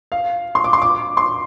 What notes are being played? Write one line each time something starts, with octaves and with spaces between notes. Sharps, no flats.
F5
C6
D6
C6
D6
C6